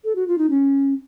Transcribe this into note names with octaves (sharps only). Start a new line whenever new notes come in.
A4
F#4
F4
D#4
C#4